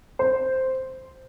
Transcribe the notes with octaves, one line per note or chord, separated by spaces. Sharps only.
C5